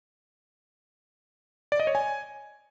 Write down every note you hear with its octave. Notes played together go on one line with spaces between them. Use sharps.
D5
D#5
C#5
G#5